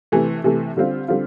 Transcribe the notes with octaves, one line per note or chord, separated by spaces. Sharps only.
C3 E3 A3
C3 E3 A3
D3 G3 C4 F4
D3 G3 C4 F4